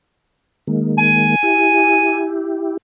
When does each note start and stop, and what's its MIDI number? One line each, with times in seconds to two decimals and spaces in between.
0.67 1.35 51
0.67 1.35 56
0.67 1.35 58
0.98 2.32 80
1.43 2.77 64
1.43 2.77 67